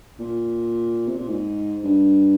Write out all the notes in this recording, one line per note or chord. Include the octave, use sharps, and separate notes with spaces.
A#2
C3
A#2
G#2
G2